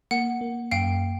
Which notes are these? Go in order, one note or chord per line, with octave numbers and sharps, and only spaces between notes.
A#3 F#5
A#3
F#2 F5 G5